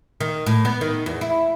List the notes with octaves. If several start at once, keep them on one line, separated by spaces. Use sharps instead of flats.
D#3
A2
B3
D#3
E2
E4